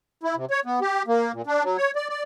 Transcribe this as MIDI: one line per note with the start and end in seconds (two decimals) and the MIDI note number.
0.23 0.35 64
0.36 0.45 48
0.51 0.60 73
0.65 0.80 59
0.81 1.03 67
1.07 1.32 58
1.33 1.42 46
1.47 1.63 62
1.63 1.77 54
1.78 1.91 73
1.96 2.08 74
2.09 2.23 74